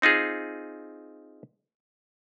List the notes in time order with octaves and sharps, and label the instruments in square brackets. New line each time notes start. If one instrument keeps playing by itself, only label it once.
[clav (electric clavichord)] C4 D#4 F4 G#4